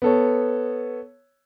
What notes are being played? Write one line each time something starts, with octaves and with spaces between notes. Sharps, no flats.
B3 A4 C#5